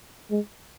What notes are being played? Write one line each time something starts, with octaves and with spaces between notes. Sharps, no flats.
G#3